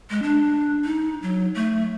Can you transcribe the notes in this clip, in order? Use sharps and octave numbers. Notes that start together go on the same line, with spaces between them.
G#3
D4
D#4
F#3
A3